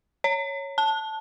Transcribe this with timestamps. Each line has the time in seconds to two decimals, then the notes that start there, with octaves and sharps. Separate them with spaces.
0.24 C#5
0.78 A5